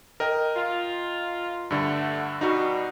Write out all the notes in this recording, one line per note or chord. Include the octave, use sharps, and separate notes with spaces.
A#4 D#5 G5
F4
G2 D3 A3 F#5
B2 G3 D#4 F#4